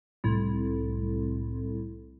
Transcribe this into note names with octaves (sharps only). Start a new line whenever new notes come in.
C2 A2